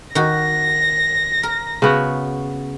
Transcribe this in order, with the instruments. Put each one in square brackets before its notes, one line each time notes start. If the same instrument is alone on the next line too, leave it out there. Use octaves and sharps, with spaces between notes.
[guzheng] D#3 F#4 [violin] A#6
[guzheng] A#4
[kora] C#3 B3 F#4